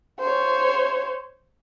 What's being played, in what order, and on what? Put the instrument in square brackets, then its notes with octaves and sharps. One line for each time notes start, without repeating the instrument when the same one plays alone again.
[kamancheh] C5 C#5